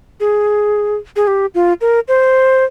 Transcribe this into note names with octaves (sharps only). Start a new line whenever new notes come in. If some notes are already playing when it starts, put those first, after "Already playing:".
G#4
G#4
G4
F4
A#4
C5